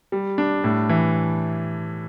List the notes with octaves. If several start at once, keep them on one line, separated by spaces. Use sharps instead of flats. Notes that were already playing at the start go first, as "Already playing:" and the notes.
G3
D4
A2
E3